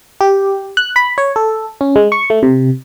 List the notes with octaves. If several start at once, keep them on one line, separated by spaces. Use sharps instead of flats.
G4
F#6
B5
C#5
A4
C#4
G#3
C#6
A3
C3